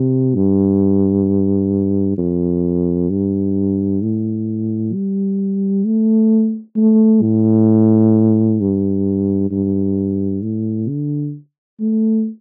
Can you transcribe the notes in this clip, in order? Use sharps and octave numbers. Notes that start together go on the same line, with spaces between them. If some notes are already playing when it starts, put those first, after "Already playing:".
Already playing: C3
G2
F2
G2
A2
G3
A3
A3
A2
G2
G2
A2
D3
A3